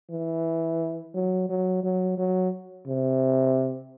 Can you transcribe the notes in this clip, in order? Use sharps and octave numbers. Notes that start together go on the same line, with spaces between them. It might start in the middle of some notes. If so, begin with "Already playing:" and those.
E3
F#3
F#3
F#3
F#3
C3